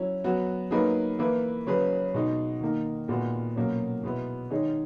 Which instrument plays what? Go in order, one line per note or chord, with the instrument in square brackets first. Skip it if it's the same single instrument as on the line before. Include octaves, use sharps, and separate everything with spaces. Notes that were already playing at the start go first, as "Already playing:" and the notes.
Already playing: [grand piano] F#3 C#4 E4
F#3 B3 F#4
F#3 A#3 D#4 G#4 B4
E3 A#3 E4 B4
C#3 F#3 C#4 G#4 B4
B2 G#3 D#4
D#3 A#3 D#4
A#2 G#3 B3 F#4
B2 F#3 A#3 C#4
B2 G#3 B3 E4
D#3 G#3 D#4 G#4 C#5